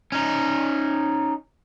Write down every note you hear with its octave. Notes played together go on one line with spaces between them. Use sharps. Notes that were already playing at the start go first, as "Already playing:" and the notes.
C#4 D#4